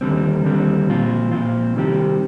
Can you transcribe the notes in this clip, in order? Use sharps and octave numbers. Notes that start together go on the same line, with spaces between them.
D#2 D3 G3 C4
D#2 D3 G3 C4
A#2 F3 C4 F4
A#2 F3 C4 F4
C3 D#3 G3 C4 G4